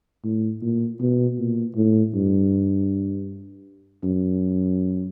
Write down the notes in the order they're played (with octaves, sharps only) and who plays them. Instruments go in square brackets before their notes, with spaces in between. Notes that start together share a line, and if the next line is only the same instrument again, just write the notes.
[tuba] A2
A#2
B2
A#2
A2
G2
F#2